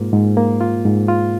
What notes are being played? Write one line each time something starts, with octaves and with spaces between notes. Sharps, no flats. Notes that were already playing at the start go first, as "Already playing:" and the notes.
Already playing: G#2 A#3 F4
G#2
A#3
F4
G#2
F4